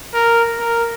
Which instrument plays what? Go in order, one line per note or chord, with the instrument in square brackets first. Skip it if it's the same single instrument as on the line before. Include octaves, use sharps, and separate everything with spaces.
[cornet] A#4
A#4